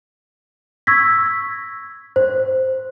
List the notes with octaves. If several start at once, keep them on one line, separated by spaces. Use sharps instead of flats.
C#6 E6 G#6 A#6 B6
C5